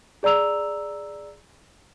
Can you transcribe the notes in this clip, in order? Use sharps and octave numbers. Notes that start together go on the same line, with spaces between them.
G#4 D5 A#5 E6 F7